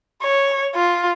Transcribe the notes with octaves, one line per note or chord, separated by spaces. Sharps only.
C#5
F4